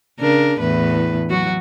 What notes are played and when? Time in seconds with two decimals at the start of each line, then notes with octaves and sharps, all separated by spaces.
0.20 C#3 D4 A#4
0.60 E2 A2 B4
1.30 F#3 F#4